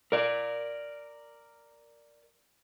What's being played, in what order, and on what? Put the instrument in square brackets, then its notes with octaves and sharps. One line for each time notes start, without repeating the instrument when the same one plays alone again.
[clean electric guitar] A#4 D5